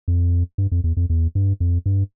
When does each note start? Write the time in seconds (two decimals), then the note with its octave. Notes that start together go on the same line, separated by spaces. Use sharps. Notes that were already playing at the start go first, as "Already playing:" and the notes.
0.08 F2
0.58 G2
0.72 F2
0.84 E2
0.97 F2
1.10 E2
1.35 G2
1.60 F2
1.86 G2